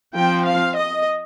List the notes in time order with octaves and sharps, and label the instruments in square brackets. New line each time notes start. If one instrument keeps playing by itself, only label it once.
[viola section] F3 C4 G5
F5
D#5